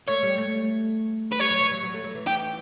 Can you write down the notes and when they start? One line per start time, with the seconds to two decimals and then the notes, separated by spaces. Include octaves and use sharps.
0.08 A3 C#5
0.23 G3
0.38 A3
1.32 B4
1.39 G3 C#5
1.51 F#3
1.60 E3
1.71 F#3
1.83 F#3
1.94 A3
2.04 F#3
2.15 E3
2.27 G4